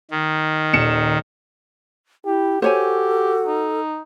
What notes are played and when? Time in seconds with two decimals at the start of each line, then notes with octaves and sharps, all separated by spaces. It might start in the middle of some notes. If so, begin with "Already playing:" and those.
0.11 D#3
0.73 D#1 C#7 E7
2.25 E4 G4
2.62 F#4 G4 A4 C5 C#5 G#5
3.45 D#4